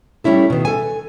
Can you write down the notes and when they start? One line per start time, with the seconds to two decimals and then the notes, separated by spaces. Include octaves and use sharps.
0.24 G3 A3 C#4 E4 A4
0.50 B2 D#3
0.65 A4 G#5